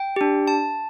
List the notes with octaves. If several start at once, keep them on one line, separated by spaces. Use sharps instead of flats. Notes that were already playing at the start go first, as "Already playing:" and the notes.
Already playing: G5
D4 G4
A5